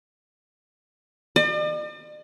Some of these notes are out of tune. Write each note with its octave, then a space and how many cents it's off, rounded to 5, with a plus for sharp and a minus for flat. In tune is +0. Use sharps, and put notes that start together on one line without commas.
D5 +45